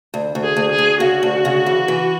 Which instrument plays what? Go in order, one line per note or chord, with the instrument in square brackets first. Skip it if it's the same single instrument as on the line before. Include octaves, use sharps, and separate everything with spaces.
[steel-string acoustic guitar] D2
D2
[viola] G#4
[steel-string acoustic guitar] D2
[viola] G#4
[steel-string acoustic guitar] D2
[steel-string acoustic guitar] C#3 [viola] F#4
[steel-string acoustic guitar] D2
C#3
E3
E3